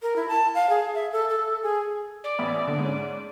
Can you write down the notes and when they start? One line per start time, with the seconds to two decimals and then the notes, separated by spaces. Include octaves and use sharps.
0.02 A#4
0.16 E4
0.28 A5
0.55 F5
0.70 G#4
0.94 E5
1.12 A4
1.29 A4
1.63 G#4
2.24 D5
2.39 A1 B3 E5
2.67 D3
2.79 G#2 C#4